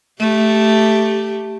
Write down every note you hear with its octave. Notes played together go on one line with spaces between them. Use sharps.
A3 G4